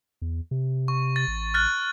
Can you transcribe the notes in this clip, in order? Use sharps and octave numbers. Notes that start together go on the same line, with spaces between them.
E2
C3
C#6
A6
A1
F6 F#6 A6